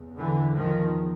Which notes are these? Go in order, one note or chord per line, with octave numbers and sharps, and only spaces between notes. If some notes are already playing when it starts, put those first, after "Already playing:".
Already playing: E2 C#3
D3 E3
D#3 F3